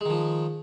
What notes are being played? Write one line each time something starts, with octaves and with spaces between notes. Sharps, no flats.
D#3 F3 G#3